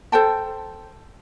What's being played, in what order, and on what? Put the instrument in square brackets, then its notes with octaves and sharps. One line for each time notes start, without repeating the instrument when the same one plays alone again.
[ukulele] A4 C5 G5 A5